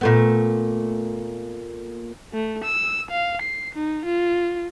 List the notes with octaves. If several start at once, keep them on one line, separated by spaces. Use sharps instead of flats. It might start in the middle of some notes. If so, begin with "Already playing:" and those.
A#2 A3 B3
A3
E6
F5
C7
D#4
F4